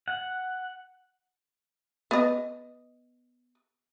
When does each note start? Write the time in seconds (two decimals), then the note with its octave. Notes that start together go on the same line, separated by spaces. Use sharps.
0.08 F#5
2.11 B3 D#5